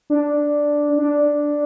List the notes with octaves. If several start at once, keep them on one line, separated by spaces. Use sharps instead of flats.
D4
D4